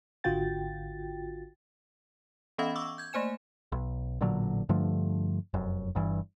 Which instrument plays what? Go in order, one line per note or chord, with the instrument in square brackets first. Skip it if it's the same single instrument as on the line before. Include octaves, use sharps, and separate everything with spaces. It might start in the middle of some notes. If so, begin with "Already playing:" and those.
[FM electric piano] G#1 D3 F4 F#4 G5 A6
[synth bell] E3 B3 C#4 D#5 F5 B5
C#6 D6 E6
G6 G#6
A3 A#3 C5 G#5 E7
[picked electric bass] B1
A1 A#2 D3 F#3
G2 D3 F3 A3
F1 F#2
G1 G2 E3